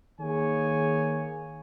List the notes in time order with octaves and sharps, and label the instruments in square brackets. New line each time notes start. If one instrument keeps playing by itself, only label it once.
[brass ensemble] D#3 A#3 G#4 C#5 G#5